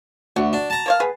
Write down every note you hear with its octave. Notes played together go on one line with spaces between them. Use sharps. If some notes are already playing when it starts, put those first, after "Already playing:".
D2 F#4
D4
A5 A#5
A#3 C#5 F5
B3 G#4 B4